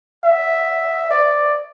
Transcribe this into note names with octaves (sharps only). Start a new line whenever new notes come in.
E5
D5